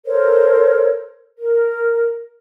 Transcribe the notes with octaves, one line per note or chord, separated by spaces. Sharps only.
A4 A#4 C5 C#5
A#4